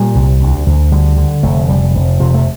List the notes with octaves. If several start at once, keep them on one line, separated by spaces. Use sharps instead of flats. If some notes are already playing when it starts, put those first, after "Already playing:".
Already playing: A#2 G3
C2
D2
D2
D3 G3
D3
F1 A3
F1 G3
F1
C3 F3
A3